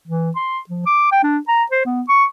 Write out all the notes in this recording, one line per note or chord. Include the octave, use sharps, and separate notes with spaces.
E3
C6
F3
D6
G5
D4
A#5
C5
B3
C#6